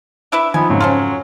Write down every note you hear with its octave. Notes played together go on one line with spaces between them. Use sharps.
D4 E4 B4 E5
F3 B3 D#4 G#5
F2 G#2 C#3 F#3
C#4 F4 A4 C5 C6